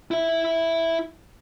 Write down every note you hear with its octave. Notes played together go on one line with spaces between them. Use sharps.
E4 E5